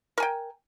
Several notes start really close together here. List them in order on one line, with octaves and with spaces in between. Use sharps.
A#4 G#5 G5